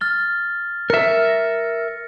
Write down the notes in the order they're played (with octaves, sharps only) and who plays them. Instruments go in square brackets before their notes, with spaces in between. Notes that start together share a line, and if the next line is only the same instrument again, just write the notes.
[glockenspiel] F6 A6 G7
[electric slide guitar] A#4 E5 [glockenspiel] C#7
[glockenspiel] A#6